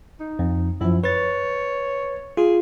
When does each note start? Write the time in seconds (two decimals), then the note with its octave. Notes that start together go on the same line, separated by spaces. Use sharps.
0.20 D#4
0.39 F2
0.81 F#2 F3 E4
1.04 B4 C#5 A6
2.37 F4 G#4